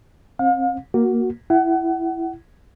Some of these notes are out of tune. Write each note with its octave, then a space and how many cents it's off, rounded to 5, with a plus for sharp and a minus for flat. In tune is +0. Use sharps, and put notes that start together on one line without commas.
C4 +35 F5 +40
A#3 +5 F#4 +0
E4 +10 F#5 +30